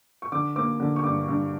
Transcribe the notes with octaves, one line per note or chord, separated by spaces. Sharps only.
C#6
D3 D6
A#3 D6
D3
C#6
G2 D6
G2